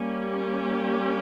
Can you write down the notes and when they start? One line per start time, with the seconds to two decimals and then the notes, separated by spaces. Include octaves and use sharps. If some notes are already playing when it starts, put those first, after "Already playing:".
Already playing: G3 A#3 C#4
0.22 G4